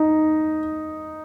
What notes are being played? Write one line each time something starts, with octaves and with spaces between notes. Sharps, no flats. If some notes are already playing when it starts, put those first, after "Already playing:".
Already playing: D#4